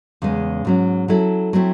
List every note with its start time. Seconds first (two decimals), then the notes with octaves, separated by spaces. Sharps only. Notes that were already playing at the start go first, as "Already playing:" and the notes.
0.22 E2 C#3 G#3
0.65 G#2 F#3 C#4
1.08 F#3 C#4 E4 A4
1.53 F#3 A3 C4 E4